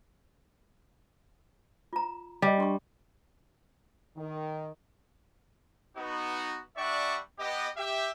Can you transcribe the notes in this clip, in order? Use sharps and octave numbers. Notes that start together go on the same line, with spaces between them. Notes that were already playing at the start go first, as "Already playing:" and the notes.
F4 A#5
G3 D#5 D6
D4 C6 C#6
D#3
B3 D#4 F#4
G3 D4 D5 E5 F#5 C#6
B3 G4 D#5
G4 E5